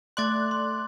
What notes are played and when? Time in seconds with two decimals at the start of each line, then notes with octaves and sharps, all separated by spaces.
0.17 A3 D5 C6 D6 F#6 A6
0.51 C6